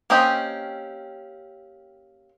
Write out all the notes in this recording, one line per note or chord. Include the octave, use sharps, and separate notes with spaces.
A#3 C4 C#4 G4 D#5